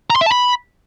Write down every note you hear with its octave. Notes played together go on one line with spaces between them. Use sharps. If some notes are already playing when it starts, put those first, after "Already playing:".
A#5
C6
E5
A5
B5